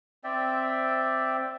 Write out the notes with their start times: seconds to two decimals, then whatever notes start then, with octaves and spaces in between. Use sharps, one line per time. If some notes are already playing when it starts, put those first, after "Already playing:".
0.24 C4 D5 E5 G5